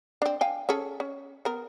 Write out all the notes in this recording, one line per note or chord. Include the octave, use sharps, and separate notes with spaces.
C4 D4
F5 G5 G#5
C#4 G#4 A4
C#4
B3 A#4